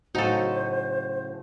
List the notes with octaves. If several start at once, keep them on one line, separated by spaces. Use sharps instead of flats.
A2 C#3 F#3 D#4 F#4 A4 C5 G#5